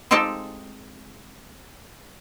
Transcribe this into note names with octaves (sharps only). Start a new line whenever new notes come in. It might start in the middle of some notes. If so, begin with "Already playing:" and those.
G#3 C4 D#4 F4 G4 A4